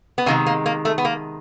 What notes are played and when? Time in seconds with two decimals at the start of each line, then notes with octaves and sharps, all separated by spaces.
0.18 B3
0.26 C3 D#3 G#3 A#3
0.46 A#3
0.66 A#3
0.85 A3
0.98 B3
1.05 A#3